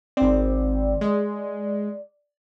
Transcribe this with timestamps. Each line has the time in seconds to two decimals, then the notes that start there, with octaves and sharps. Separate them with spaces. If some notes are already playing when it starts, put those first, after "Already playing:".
0.17 G#1 C4 D5
1.01 G#3